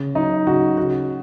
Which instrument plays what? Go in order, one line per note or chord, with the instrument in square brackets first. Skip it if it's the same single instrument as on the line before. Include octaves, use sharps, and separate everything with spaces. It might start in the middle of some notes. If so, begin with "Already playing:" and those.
Already playing: [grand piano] C#3
F#3 D#4
C#3 F#4
C#3 F#4